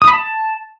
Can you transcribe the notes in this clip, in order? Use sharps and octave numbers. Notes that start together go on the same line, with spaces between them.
D#6
B5
A5